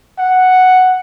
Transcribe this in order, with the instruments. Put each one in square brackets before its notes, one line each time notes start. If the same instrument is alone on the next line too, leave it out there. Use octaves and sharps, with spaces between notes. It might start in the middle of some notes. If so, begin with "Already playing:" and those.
[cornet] F#5